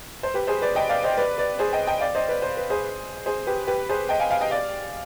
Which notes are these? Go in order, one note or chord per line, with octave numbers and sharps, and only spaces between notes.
C5
G4 B4
G#4 C5
B4 D5
D#5 G5
D5 F5
C5 D#5
B4 D5
B4 D5
G#4 C5
D#5 G5
D#5 G5
D5 F5
C5 D#5
B4 D5
C5
B4
G#4 C5
G#4 C5
G4 B4
G4 B4
G#4 C5
D#5 G5
F5 G#5
F5 G#5
D#5 G5
D5 F5